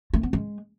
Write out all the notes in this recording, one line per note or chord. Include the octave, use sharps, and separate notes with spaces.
A3
B3
G#3